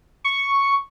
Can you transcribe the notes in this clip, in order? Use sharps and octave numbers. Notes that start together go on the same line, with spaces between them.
C#6